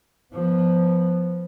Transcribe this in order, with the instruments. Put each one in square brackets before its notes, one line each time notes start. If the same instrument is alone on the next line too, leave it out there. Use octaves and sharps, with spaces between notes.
[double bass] F3 B3